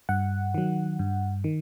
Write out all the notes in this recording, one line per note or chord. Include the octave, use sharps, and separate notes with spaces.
G2 F#5
D#3 F#3
G2
D#3